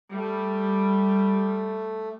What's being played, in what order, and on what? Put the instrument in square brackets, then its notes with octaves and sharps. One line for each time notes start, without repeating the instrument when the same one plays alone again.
[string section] G3 [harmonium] A3